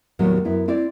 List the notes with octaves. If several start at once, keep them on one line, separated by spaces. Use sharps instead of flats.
D#2 A2 F#3 G3 B3
F#2 B3 E4
C4 E4 D5